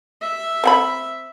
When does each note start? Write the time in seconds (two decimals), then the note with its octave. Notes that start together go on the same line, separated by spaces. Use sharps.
0.22 E5
0.64 C4 F#5 B5